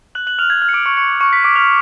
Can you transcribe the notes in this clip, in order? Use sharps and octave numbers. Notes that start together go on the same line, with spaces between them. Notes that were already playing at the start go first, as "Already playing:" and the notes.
F#6 F#7
F#6 F#7
F6 F7
G#6
F6
C#7
D6 D7
C#6 C#7
C#6 C#7
C#6 C#7
B6
D6 D7
F6 F7